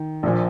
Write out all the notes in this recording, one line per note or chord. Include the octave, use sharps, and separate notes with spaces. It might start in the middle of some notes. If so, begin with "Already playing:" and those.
Already playing: D#3
A#1 A#2 F3